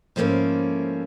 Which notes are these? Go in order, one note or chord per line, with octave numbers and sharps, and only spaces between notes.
G#2 F3 A3 A#3 C#4 E4